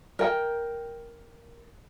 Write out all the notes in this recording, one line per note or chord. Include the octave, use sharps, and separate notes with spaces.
A#4 G5